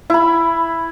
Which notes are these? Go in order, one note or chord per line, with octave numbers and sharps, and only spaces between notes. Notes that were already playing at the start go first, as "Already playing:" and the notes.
E4 B5